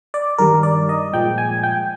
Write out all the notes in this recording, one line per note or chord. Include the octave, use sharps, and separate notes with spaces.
D5
G2 D#3 G3 A#4
D5
D#5
A#2 F3 G#3 G5
G#5
G5